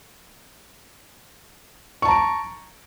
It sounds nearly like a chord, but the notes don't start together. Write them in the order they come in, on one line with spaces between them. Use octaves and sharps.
C#6 A5 A#5 D7